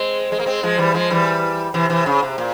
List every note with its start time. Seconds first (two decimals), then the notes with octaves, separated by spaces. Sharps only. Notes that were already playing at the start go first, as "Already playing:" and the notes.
Already playing: G#3 C4
0.32 G#3
0.40 A#3
0.46 G#3 C4
0.63 F3 G#3
0.78 E3 G3
0.94 F3 G#3
1.10 E3 G3
1.74 C3 E3
1.90 C3 E3
2.06 C#3
2.23 C3
2.38 A#2